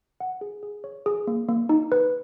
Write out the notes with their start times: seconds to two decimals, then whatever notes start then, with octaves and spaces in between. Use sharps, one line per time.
0.20 F#5
0.41 G#4
0.63 G#4
0.84 C#5
1.06 G#4
1.27 A#3
1.49 A#3
1.69 D#4
1.92 B4